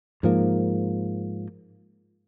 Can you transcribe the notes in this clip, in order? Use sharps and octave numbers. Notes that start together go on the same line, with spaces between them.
G#2 F3 A#3